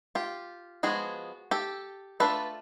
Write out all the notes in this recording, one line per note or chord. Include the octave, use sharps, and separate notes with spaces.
F4 G4
F3 G#3 B3 F#4 G#4
G4 A4
A3 D4 F4 A4 B4